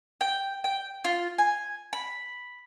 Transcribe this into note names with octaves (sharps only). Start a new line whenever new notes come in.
G5
G5
F4
G#5
B5